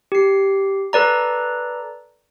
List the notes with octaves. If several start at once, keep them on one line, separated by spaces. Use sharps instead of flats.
G4 C7
A4 B4 D5 A#5